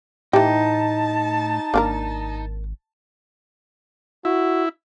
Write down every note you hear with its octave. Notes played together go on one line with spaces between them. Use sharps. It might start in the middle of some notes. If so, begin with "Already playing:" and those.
A2 E3 D#4 G4 A5
G#1 A#3 D4 A#4
E4 F#4